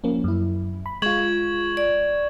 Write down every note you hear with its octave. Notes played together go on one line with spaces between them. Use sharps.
F3 A#3 C#4
F#2 E4
B5
G#3 F4 C#6 G#6 F#7
D5